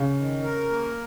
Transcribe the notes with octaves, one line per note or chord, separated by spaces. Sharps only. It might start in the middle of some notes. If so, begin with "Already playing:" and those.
Already playing: C#3
D#3
A#4
A#3